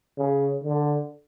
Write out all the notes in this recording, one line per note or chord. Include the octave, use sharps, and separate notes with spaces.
C#3
D3